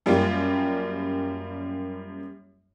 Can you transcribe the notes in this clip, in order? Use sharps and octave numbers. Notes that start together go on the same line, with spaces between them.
F#2 G3 A#3 F4